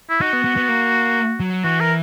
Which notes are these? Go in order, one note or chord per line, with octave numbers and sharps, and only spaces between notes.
E4
D#4 F#4
B3
B3
B3
A#3
F#3
E3 F#4
A#4